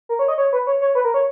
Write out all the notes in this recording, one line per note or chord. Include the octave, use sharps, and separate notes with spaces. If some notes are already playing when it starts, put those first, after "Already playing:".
A#4
C#5
D#5
C#5
B4
C#5
C#5
B4
A#4
C#5